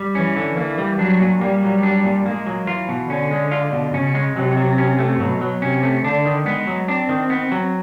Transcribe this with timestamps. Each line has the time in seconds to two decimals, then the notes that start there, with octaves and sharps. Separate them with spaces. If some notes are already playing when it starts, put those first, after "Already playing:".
Already playing: G3
0.15 E3 C#4
0.36 D3
0.57 E3 A#3
0.78 G3
0.99 F#3 D4
1.20 A#2
1.41 G3 A#3
1.62 F#3
1.83 D4
2.04 A#2
2.26 G#3 A#3
2.46 F#3
2.67 E3 F4
2.89 B2
3.10 D3 C#4
3.31 G#3
3.51 F4
3.72 B2
3.94 C#3 C#4
4.15 G#3
4.36 C3 F#3
4.57 F#3
4.78 C#4
4.99 A3
5.19 B2 F#3
5.41 F#3
5.62 C3 C#4
5.83 A3
6.04 D3 D4
6.25 D#3
6.46 G#3 B3
6.67 F#3
6.88 C4 D4
7.09 D#3
7.30 B3
7.52 F#3